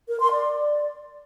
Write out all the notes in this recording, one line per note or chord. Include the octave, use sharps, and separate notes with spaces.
A#4
C6
D5